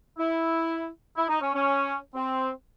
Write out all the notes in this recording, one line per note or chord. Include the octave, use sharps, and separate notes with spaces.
E4
E4
D#4
C#4
C#4
C4